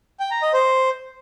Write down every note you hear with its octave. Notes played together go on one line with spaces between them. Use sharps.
G5
A#5
D#5
C5